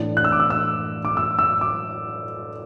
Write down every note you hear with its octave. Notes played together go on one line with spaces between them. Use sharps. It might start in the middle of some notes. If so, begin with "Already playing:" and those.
Already playing: A2 E3 D4
F#6
E6
D6
E6
E6
D6
E6
E6
D6